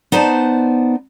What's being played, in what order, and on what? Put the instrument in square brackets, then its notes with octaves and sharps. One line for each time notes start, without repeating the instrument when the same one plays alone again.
[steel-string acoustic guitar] B3 D#4 C5 D5 A5